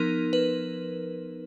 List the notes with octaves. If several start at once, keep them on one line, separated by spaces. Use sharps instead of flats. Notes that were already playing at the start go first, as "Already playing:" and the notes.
Already playing: F3 B3 D#4 A#4
B4